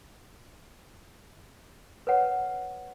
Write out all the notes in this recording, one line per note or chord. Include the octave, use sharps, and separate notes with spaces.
B4 C#5 F#5